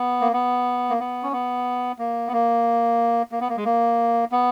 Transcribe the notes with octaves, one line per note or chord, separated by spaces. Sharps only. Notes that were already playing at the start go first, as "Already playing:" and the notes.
Already playing: B3
A#3
B3
A#3
B3
C#4
B3
A#3
B3
A#3
A#3
B3
A#3
G#3
A#3
B3